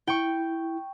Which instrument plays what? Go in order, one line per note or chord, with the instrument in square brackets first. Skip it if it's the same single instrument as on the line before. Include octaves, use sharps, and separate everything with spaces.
[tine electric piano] E4 [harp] G5 C#6